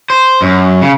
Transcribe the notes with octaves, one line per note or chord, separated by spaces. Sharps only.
C5
F#2
C#3